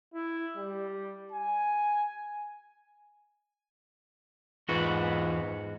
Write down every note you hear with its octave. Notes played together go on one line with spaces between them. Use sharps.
E4
G3
G#5
E2 G#2 F4 F#4 B4